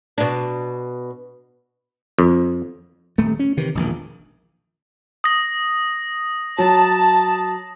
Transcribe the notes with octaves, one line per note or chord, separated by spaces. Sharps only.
B2 D4
F2
D#1 A3
C#4
C3 D#3 E3
E1 A#1 D#3
D#6 A#6
F#3 A5